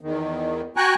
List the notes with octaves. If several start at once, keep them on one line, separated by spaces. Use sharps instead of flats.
E2 D#3
F#4 G5 G#5 A#5 C#6 F#6